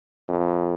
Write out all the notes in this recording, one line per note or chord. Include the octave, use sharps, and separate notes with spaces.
F2